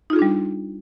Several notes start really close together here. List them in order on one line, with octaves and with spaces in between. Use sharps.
D#4 F4 G#4 D4 G3